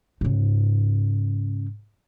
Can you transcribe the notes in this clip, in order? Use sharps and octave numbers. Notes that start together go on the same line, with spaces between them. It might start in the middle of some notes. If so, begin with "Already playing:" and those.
G#2 C#3